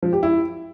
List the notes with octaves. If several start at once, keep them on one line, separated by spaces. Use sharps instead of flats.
F3
G4
E4